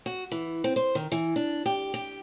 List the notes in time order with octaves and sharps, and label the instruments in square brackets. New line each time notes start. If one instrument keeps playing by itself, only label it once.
[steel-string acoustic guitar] F#4
E3
C4
C5
D#3
E3
D4
G4
G4